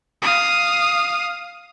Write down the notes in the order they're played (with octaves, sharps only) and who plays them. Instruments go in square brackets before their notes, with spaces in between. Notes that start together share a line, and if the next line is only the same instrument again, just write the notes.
[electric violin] F5 D#6